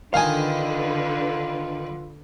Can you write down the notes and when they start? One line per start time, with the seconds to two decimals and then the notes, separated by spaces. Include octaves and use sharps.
0.14 D3 D#3 D#4 F4 B4 F5 G#5